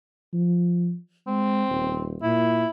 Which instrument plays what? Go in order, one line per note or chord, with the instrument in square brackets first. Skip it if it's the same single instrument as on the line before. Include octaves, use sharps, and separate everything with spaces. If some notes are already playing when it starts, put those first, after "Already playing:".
[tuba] F3
[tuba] G#3 [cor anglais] C4
[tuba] D#1
[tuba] A#2 [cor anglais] E4